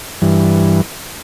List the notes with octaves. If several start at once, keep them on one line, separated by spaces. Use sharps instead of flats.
G2 E3